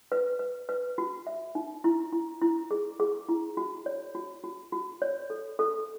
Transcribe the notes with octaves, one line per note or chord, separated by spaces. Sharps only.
B4
B4
B4
F#4
E5
D#4
E4
E4
E4
G#4
G#4
E4
F#4
C#5
F#4
F#4
F#4
C#5
A4
A4